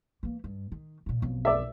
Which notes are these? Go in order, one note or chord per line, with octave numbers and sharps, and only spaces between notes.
E3 A#3
G2
D#3
A#2 C#3
B1 F2
D5 E5